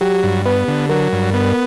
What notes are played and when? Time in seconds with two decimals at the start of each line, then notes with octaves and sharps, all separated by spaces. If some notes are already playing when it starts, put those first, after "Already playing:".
0.01 F#3 G4
0.23 G2
0.45 B3 B4
0.68 D3
0.89 F#3 A#4
1.12 G2
1.34 B3